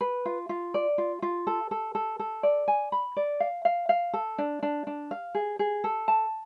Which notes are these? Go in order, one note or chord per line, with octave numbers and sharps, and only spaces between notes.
B4
F4
F4
D5
F4
F4
A4
A4
A4
A4
D5
G#5
B5
D5
F5
F5
F5
A4
D4
D4
D4
F5
G#4
G#4
A4
A5